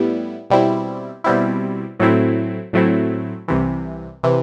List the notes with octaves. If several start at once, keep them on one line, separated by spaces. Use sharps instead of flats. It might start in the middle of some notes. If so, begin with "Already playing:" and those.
Already playing: A2 G3 B3 E4
B2 G3 C4 E4
B2 G3 C4 E4
A2 F#3 A3 C4 E4
A2 F#3 A3 C4 E4
C2 C3 E3
C3 E3